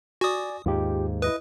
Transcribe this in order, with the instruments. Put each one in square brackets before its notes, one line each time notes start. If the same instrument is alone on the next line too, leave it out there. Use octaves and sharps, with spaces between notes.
[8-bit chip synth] F#4 D#6 [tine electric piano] D5 G#5
[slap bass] D#2 G#2 [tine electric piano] F4 G4
[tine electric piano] E4 D#5 D#6 [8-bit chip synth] B4